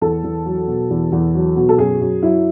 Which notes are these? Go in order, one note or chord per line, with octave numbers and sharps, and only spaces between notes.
E2 A4
E2
F#3
B2
E2
E2
F#3
B2
A4
F#2 G#4
F#2
F#3 E4